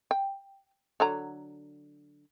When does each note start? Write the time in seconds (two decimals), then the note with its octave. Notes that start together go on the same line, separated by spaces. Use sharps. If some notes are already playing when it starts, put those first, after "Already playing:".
0.11 G5
1.00 D3 F#3 A#5